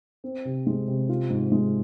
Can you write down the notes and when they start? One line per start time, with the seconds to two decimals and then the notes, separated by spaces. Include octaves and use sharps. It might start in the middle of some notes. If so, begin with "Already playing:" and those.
0.24 C4
0.45 C3
0.67 G#3
0.88 C3
1.09 F4
1.30 G#2
1.52 G#3